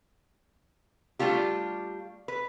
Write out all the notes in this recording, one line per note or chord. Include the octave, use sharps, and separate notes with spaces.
G3 A3 D4 F4 G4
B4